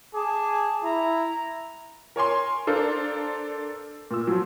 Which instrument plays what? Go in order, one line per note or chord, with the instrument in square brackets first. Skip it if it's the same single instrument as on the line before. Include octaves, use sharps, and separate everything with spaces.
[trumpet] G#4 [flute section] A5 D6
[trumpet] E4 [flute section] A#5
[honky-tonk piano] A#4 C#5 G#5 C6
D4 A4 A#4 C5 F5
A#2 E6
F3 F#3